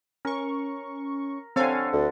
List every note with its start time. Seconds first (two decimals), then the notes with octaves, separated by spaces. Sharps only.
0.25 C#4 A#4 C#6
1.56 D3 C4 A4 C#5 F5 G#5
1.93 D2